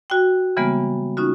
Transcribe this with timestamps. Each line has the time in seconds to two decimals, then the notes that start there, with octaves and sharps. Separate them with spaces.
0.10 F#4 G5
0.57 C#3 E3 G3 G#3 A#3 B3
1.17 C#4 D#4 F4 F#4